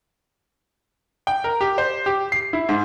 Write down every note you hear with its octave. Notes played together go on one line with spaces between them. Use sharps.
G5
A#4
G4
C5
G4
C7
E4
G#2